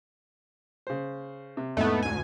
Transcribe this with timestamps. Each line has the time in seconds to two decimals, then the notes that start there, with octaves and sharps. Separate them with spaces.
0.87 C#3 C5
1.57 C3
1.77 F2 A2 G#3 A3 B3 D#4
2.02 D2 G#5